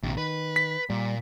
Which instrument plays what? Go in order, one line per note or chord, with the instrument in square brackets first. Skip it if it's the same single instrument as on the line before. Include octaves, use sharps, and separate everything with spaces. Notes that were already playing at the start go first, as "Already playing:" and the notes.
[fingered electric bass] A#1 [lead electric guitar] D#2 C3
[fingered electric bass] D#3 [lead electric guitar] B4
[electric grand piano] B6
[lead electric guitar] A#2 [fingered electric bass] G3